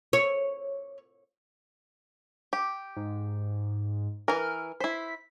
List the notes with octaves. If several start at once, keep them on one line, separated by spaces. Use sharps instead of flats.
C#5
G4
G#2
E3 A#4 F6
E4 C5 B6